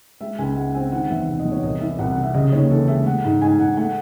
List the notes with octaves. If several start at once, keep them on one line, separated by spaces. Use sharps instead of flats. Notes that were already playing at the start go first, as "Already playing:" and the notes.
G#3 E5
C#2 G#5
G#3 F#5
C4 G#5
D#3 F#5
E2 E5
C3
D#5
E2
C#5
C2 D#5
E3 E5
C2 F#5
F#5
C3
E5
C#3 D#5
D#2 C#5
E3 A4
G#3 E5
A3 F#5
G#2
G#2 G#5
G#2 F#5
A3 F#5